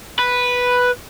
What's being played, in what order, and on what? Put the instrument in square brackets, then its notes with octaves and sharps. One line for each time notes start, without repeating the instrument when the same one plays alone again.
[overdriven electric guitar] B4